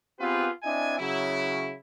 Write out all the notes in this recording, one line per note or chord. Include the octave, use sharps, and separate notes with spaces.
B3 C4 F4 G4 G#4 B4
C4 D4 E4 D#5 G#5
C#3 F#3 E4